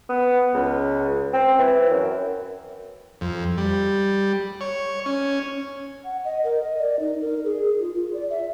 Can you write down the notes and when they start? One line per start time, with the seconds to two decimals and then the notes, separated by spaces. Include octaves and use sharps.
0.09 B3
0.54 C#2
1.33 C4
1.59 E3
1.90 F#2
3.21 F2
3.58 G3
4.61 C#5
5.06 C#4
6.04 F#5
6.25 D#5
6.44 A#4
6.64 D#5
6.78 D5
7.00 D#4
7.20 A#4
7.45 G#4
7.80 F4
7.94 F4
8.13 D5
8.30 E5